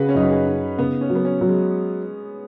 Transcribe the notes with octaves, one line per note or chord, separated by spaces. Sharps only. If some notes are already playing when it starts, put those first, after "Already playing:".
Already playing: C#3 F#4 G#4 B4
C#4
F#2 D#4
F#4
G#4
D#4
C#3 B3
C#4
F#3
B3
C#4
F#3
G#3